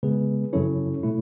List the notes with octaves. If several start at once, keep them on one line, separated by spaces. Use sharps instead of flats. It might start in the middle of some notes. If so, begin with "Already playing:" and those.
C#3 G#3 B3 G#4 B4
F#2 C#3 F#3 C#4 E4 A4 C#5
B2 A3 E4